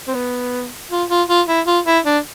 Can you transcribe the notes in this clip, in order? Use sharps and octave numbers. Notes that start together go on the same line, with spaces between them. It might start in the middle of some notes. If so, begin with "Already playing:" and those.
C4
B3
F4
F4
F4
E4
F4
E4
D4